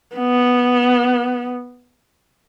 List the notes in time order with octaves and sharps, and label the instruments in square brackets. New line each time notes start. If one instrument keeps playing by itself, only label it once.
[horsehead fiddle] B3